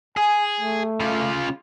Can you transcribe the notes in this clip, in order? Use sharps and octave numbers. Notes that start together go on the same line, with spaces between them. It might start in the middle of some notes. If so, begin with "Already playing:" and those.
G#4 G#5
A3
C#3 F4